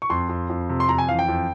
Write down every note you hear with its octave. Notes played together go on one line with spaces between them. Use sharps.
C#6
F2 C6
F2
F2
C3
C6
F2 A#5
G#5
E3 F5
G5
F2